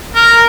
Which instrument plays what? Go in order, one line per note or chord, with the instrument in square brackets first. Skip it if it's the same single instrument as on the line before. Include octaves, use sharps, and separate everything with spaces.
[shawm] A#4